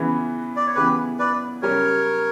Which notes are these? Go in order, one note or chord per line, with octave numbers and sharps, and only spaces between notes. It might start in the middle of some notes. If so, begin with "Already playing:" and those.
Already playing: C#3 E3 B3
D5
C#5
C#3 E3 B3 G4 B4
B4 D5
C#3 G3 C#4 A#4 C#5